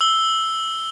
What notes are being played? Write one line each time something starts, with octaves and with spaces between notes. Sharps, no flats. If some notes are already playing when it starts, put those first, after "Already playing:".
E6 G7